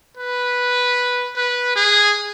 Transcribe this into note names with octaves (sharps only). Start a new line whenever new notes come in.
B4
B4
G#4